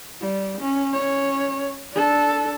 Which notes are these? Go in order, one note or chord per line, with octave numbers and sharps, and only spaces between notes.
G3
C#4
C#4 C#5
D4 A4